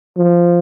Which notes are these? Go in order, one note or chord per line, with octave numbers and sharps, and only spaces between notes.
F3